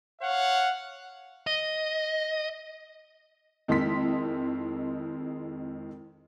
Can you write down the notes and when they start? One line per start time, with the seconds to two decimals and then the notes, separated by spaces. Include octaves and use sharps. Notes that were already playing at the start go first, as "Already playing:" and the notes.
0.21 C#5 F5 F#5
1.47 D#5
3.68 F2 D#3 G#3 E4 C6 B6